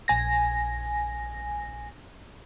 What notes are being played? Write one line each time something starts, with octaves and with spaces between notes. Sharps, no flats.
A#1 G#5 A#6